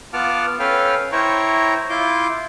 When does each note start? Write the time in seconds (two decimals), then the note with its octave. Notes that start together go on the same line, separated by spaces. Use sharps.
0.13 B3 F4 F#5 A5 D6 F6
0.59 C#4 A4 B4 F5 G5 F6
1.12 E4 C5 C#5 G5 A#5 C#6
1.90 E4 F4 C6 D6 G6